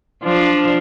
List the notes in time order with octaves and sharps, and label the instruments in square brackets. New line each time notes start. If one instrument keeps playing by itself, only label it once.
[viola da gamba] F3 [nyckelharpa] D4 F5